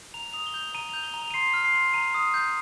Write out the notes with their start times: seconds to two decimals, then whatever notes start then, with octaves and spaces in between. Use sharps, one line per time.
0.14 A#5 F7
0.33 D#6 F7
0.47 G7
0.54 G6 F7
0.74 A#5 D#7
0.89 G6 F7
1.03 G7
1.14 A#5
1.20 F7
1.31 D#7
1.34 C6 C7
1.54 F6
1.64 C7
1.74 C6
1.94 A#5 D#7
2.14 D#6
2.34 G6